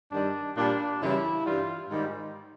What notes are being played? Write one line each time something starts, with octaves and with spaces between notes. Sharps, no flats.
G2 D#3 G3 D4
A#2 G3 D4
F#2 C#3 E3 G3 E4
G2 E3 G3 F4
G#2 D#3 G3